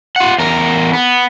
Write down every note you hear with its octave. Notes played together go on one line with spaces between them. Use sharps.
F4 F#5
E2 A#4
B3